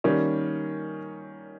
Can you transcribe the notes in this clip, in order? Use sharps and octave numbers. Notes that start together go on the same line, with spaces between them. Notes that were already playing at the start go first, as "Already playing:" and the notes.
D#3 G3 A#3 C#4